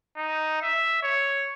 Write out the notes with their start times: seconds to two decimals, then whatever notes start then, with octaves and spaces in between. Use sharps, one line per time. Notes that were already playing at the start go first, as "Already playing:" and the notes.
0.17 D#4
0.62 E5
1.03 C#5